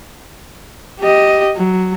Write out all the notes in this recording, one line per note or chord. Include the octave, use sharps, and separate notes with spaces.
G4 D#5
F#3